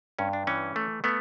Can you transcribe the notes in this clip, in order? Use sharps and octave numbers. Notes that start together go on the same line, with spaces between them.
G2 C#4
D4
E3 C#4
A3
A3 B3